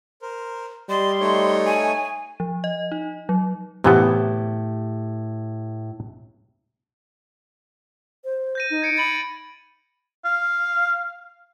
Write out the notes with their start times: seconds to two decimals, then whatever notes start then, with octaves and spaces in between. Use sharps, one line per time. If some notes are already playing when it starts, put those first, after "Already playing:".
0.22 A#4 C5
0.89 G3 D5 D#5 C6
1.20 A3 D#4 C#5
1.65 G#5
2.40 F3
2.64 D#5
2.92 D#4
3.29 F#3
3.84 A2 C3 E3 B3 G4
8.25 C5
8.55 G6 A#6 D#7
8.70 D#4
8.82 G#6 C#7 D7
8.97 B5 A6 F#7
10.25 F5